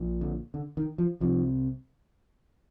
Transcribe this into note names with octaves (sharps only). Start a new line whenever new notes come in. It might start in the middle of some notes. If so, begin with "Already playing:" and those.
Already playing: A#1 A#2
D3
D3
D#3
F3
C2 C3 F3